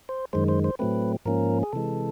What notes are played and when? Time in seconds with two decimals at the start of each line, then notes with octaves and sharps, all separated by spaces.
0.09 C5
0.33 F#2 D#3 G#3 C5
0.48 C5
0.64 C5
0.79 A2 F#3 A3 C4 B4
1.26 G#2 F3 A#3 C#4 A#4
1.63 G#4
1.73 C3 E3 G#3 A4